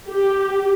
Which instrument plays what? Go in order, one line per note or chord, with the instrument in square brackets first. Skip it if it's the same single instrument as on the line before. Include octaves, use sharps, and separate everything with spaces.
[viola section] G4